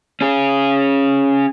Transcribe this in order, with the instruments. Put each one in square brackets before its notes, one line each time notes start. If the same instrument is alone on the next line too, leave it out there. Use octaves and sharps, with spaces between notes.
[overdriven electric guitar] C#4 G#4